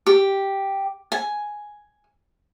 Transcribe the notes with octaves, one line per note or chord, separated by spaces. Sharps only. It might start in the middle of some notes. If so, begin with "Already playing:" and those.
G4
G#5